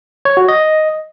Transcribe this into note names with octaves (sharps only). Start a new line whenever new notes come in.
C#5
F#4
D#5